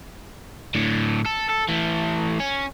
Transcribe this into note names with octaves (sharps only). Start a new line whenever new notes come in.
A2 D3
A4
A4
E3 A3
C#4